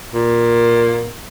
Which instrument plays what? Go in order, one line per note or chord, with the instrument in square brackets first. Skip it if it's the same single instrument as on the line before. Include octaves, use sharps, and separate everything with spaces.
[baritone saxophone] A#2